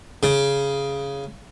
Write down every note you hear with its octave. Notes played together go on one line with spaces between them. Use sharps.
C#3